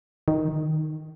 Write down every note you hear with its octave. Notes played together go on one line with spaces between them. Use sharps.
D#3